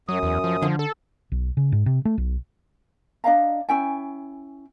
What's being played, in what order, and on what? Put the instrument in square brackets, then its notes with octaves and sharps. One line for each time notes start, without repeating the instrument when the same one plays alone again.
[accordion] F#2 D#6 [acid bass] F#3
[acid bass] E2
F3
[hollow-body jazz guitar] D3 [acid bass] F3
[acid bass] A4
[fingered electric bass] B1
C#3
G#2
C3
A3
B1
[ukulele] D4 D#5 F5 A#5
C#4 E4 G5 G#5